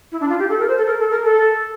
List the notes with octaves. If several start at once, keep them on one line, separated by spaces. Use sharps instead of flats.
E4
D4
F4
G4
A4
A#4
C5
A4
A#4
A4
A#4
A4